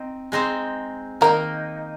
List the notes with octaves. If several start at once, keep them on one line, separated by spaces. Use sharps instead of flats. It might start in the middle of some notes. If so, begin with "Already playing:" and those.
Already playing: C4 D#4
G#3 C4 D#4 C5
D#3 A#3 D#4 A#4